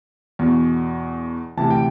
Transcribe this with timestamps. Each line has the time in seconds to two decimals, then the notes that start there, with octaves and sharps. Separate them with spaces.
0.39 E2 B2
1.57 D2 C3 E3 A5
1.71 G5